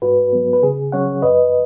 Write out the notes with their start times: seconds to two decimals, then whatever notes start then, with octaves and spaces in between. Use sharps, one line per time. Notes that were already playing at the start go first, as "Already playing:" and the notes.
0.02 G#2 F#4 B4
0.33 F#3 B3
0.53 B4
0.62 C#3 G#4
0.92 F#3 C#4 C#5 F#5
1.22 F#2 B4 D#5